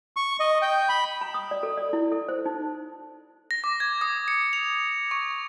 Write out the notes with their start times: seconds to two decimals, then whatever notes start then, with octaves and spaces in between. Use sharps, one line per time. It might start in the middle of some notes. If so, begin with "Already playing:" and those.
0.17 C#6
0.40 D#5
0.62 G5
0.89 B5
1.21 A#5
1.34 D#6
1.51 D5
1.63 A4
1.78 D5
1.93 E4
2.12 A4
2.29 C5
2.46 D#4
3.51 A#6
3.64 D6
3.80 G#6
4.01 D#6
4.28 C#7
4.53 F7
5.11 C#6